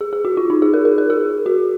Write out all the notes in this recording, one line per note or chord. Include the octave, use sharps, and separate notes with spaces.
G#4
G#4
F#4
F4
D#4
G#4
A#4
A#4
A#4
G#4
F#4